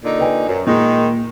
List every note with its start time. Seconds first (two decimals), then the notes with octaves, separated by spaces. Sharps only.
0.03 A#2 D3 D#4
0.19 B4 G5 G#5
0.48 F#2
0.67 A#2 D#3 G#3 D#4